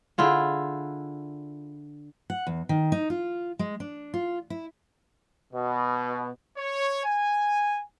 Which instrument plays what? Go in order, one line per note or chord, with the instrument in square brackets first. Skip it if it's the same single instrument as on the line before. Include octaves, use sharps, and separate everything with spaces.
[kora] D3 E4 F4 G#4
[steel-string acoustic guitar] F#5
E2
D#3
D#4
F4
G#3
D4
F4
E4
[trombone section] B2
[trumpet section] C#5
G#5